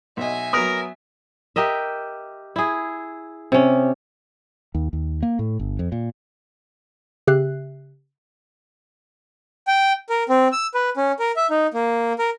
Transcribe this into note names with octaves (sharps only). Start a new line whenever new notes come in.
B1 D#5 E5 G#5
F#3 B3 A#4 D#6
G4 A#4 D#5 E5
E4 G#4
C3 C#4
D#2
D#2
A#3
A2
G1
F2
A#2
C#3 G4 E5 F#6 C7
G5
A#4
C4
E6
B4
C#4
A#4
E5
D#4
A#3
A#4